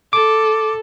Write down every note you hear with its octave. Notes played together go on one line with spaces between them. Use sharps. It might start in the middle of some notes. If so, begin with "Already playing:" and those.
A4 D6